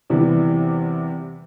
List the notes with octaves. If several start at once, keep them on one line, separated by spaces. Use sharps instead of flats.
E2 C3 E3 G3